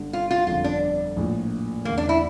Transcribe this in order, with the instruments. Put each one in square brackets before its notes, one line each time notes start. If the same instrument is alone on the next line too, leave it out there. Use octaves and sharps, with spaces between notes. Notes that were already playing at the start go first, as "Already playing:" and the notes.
Already playing: [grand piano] G1 G2 D3
[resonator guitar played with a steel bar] F4
F4
[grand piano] G1 F2 D3 [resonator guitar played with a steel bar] F4
[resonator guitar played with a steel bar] D4
[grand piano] A#1 A2 F3
[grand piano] E2 D3 A3 [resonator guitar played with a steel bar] A#3
[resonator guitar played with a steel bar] D4
E4